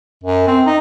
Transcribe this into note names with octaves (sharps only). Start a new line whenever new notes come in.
F#2
C4
D#4